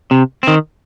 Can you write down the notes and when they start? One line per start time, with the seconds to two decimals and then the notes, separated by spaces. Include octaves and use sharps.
0.11 C3
0.43 D#3 C4